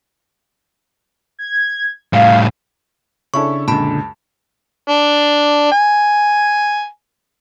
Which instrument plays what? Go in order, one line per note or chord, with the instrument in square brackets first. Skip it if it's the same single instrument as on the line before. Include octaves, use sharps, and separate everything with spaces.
[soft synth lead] G#6
[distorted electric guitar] A2 G3 [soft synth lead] F5
[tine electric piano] C#3 D4 [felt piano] C#4 E4 A4 [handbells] C#6
[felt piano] C#2 F#2 [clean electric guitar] A#2 D3 [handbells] A5 B5
[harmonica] D4
G#5